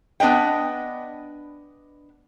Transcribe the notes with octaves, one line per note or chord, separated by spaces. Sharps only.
B3 D4 B4 D#5 G5